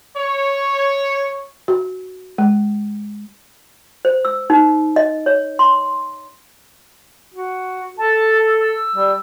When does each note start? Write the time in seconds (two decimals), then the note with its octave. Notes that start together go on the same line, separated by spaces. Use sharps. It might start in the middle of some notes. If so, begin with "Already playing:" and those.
0.17 C#5
1.68 F#4
2.38 G#3
4.05 C5
4.25 E6
4.50 D#4
4.96 D#5
5.26 C#5
5.59 C6
7.34 F#4
7.98 A4 A5
8.61 E6
8.96 G3